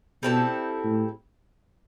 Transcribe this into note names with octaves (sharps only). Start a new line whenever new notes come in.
B2 G3 C4 E4 A4
A2